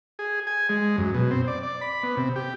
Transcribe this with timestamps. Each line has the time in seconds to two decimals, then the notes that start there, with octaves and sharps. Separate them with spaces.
0.19 G#4
0.47 G#5
0.69 G#3
0.98 F#2
1.14 B2
1.31 C4
1.48 D5
1.63 D5
1.81 B5
2.03 B3
2.17 C3
2.36 G4